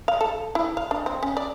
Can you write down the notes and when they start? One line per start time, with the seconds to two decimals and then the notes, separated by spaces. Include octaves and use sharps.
0.08 F5
0.21 A4
0.55 E4
0.77 F5
0.91 D4
1.06 C4
1.23 C#4
1.37 D5